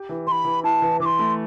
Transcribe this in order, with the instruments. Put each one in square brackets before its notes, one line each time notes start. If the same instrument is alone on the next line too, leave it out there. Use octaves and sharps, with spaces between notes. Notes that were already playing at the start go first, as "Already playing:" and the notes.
Already playing: [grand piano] G4
E3
[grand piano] E3 [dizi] B5 C6
[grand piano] E3
[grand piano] E4 [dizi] A5
[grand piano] E3
[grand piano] E3 [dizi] D6
[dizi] C6
[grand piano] A3